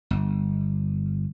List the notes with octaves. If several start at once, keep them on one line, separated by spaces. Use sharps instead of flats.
G1